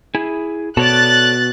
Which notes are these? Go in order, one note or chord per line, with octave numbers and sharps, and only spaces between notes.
E4 G#4
B2 A4 C#5 D5 F#6 A6